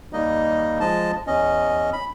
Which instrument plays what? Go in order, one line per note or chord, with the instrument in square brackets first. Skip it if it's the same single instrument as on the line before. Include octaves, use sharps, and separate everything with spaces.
[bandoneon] D#2 G3 A#3 D#4 D#5
F3 G#3 D#5 A5
E2 C#4 D#5
B5